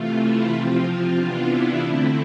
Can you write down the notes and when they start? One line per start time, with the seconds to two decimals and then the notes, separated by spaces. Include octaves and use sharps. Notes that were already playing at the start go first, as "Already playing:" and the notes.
Already playing: C3 E3 A3 F4
0.20 E4
0.52 C3 F3 C4 F4
1.17 C3 E3 B3 D4 F4
1.50 E4
1.81 D3 A3 C4 E4